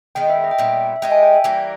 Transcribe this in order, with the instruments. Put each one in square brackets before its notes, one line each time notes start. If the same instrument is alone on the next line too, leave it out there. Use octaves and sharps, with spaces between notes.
[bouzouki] D#3 G#3 B3 [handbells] G5
[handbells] E5
D#5
G5
[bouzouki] A#2 G3 B3 [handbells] E5
[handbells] E5
[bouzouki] G#3 D#4 G4 [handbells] G5
[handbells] G#5
G5
E5
[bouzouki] E3 G3 A#3